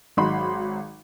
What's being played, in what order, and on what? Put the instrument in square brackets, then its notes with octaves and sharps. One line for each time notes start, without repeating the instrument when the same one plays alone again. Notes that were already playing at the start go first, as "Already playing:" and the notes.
[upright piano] G#1 F#3 D#4 F#4 B5 C6